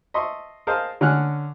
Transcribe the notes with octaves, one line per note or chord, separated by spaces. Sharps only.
D#5 E5 A5 C6 C#6
G#4 A#4 C5 D#5 F5 A5
D3 C#4 G#5 F6 F#6